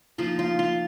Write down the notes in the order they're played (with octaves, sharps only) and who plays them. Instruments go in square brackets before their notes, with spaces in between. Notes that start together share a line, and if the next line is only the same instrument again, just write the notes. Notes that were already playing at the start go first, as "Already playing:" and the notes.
[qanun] F3 A#3 D#4 F4
F4
F4